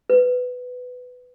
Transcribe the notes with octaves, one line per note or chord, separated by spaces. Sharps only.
B4